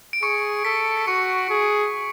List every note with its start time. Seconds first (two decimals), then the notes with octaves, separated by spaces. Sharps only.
0.13 D7
0.22 G#4 C#6 C#7
0.65 A4 B6
0.97 B6
1.07 F#4 C#6 C#7
1.50 G#4